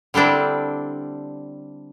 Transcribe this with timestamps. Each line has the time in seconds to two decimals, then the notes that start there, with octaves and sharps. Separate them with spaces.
0.14 D3 G3 C4 D4 E4